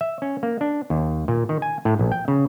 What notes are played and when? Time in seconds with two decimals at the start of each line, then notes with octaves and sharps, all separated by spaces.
0.01 E5
0.22 C#4
0.43 A#3
0.61 D4
0.90 D#2
1.28 A#2
1.49 D#3
1.62 G#5
1.85 A2
1.99 A#1
2.12 G5
2.28 C#3